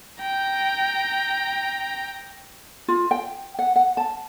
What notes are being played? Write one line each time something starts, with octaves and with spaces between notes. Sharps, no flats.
G5 A#5
F4
G5
F#5
F#5
A5